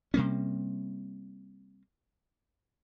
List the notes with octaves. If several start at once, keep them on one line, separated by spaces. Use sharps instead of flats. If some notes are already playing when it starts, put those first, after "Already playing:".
C3 G3 A#3 C#4